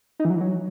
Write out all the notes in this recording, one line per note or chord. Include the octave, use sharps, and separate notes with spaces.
D#4
E3
F#3
E3
F#3